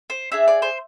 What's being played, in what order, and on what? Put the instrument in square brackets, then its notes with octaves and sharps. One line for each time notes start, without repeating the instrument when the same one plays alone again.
[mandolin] C5
D4 G#4 E5
D5
C5